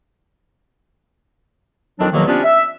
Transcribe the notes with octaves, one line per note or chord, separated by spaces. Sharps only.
F2 D#3 F#3 C4 D4
E2 B2 D#3 F3 F#3 A#3
C3 G3 B3 C#4 D4 F4
E5